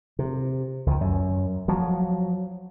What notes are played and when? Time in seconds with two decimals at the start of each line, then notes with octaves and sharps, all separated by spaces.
0.19 C3
0.86 C#2 D#3
1.01 F#2
1.68 F3 F#3